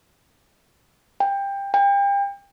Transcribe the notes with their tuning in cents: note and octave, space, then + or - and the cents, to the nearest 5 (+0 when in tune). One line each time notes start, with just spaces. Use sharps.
G5 +20
G5 +35